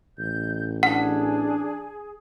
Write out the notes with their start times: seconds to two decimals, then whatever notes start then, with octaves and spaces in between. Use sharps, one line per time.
0.19 A1 G6
0.83 D4 G#4 F#5